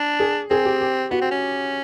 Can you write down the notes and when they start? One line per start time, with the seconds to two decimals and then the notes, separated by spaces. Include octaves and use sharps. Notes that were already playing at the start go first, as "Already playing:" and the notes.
Already playing: D4
0.20 G#4
0.50 C4 G#4
0.65 G4
0.81 G4
1.11 B3 F#4
1.22 C4
1.31 C#4